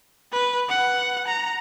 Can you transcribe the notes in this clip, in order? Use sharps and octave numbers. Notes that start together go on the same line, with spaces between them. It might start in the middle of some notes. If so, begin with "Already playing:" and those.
B4
F#5
A#5